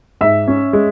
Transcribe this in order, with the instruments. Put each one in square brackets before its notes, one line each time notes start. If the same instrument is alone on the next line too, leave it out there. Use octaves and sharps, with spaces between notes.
[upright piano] G#2 E5
C#4
G#3